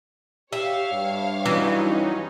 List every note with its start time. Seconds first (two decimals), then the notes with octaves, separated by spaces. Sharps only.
0.53 G4 C#5 E5 F5
0.92 G2
1.46 E3 F#3 C#4 D#4